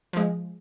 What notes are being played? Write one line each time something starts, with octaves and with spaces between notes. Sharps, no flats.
F3 G#3